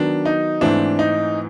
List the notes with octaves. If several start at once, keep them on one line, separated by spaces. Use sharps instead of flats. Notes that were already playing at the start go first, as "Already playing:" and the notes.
Already playing: D#3 F#3 B3 D4
D#4
G#2 E3 A3 C4 D4 E4
D#4